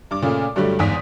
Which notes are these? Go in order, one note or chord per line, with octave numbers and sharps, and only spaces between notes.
G2 D6
A#2 C#3 A3
G2 D3 F#3 G3 A3
G1 E2 G#2 D#6 B6